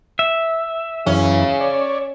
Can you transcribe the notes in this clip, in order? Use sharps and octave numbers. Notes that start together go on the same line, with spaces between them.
E5
F#2 C#3 E3 C#4
C#5 D5